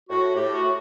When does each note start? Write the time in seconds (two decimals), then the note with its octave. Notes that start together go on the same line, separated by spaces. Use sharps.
0.10 A2 F#4
0.36 A2 G4
0.54 F#4
0.62 A2